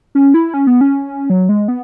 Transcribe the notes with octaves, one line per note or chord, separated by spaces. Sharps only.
C#4
E4
C#4
B3
C#4
F#3
G#3
B3